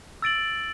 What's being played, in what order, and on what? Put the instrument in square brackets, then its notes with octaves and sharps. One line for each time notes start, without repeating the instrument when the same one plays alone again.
[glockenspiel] E6 A6 D7 F#7